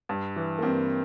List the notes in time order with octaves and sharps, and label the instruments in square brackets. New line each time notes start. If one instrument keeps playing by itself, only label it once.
[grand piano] G2
E3
[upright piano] A#3
[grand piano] G2 [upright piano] C4